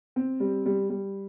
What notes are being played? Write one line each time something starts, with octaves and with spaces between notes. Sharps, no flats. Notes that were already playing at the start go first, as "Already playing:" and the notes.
C4
G3
G3
G3